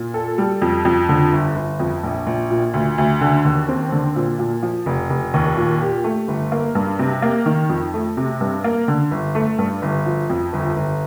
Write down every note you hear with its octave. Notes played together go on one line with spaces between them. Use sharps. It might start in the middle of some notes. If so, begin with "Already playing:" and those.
Already playing: A#2
A4
G3
F2
F2
D3
G1
G1
F2
A#1
A#1
A#2
D2
D2
D3
D#2
C4
D3
A#2
A#2
F3
F1
F1
D#2
A#2
G4
A3
G1
A#3
G2
C3
A#3
D#3
F2
A3
C3
G2
A#3
D3
G1
A3
G2
G1
F3
F2
G1
G1